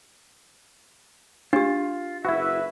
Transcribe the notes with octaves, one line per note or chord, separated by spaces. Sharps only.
D4 F4 G4
F#1 E4 F#4 B4 E5